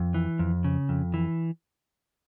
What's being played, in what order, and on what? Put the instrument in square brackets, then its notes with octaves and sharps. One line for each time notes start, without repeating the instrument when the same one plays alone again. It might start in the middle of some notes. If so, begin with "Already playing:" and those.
Already playing: [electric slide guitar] F2
E3
F2
C#3
F2
E3